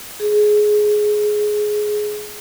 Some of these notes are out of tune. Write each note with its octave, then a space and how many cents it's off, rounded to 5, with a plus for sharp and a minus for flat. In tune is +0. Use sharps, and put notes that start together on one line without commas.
G#4 +15